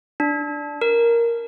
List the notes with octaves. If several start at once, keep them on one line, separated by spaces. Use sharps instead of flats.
D4
A#4